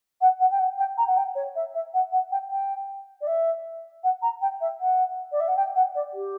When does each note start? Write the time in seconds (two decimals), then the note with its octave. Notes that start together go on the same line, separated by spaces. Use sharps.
0.21 F#5
0.40 F#5
0.51 G5
0.59 F#5
0.79 G5
0.98 A#5
1.07 F#5
1.17 G5
1.35 C#5
1.55 E5
1.74 E5
1.94 F#5
2.12 F#5
2.31 G5
2.50 G5
3.21 D5
3.27 E5
4.04 F#5
4.22 A#5
4.42 G5
4.61 E5
4.80 F#5
5.32 D5
5.40 E5
5.48 F#5
5.56 G5
5.75 F#5
5.95 D5
6.14 G4